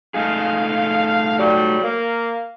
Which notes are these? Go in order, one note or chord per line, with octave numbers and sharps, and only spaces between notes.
A3 D#4 G#4 F5
F#3 G3
A#3